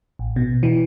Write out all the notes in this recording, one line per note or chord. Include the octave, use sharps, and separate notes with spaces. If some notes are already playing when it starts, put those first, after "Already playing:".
A1
B2
E3